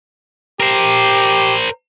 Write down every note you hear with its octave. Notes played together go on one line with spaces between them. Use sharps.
G4 A#4 C5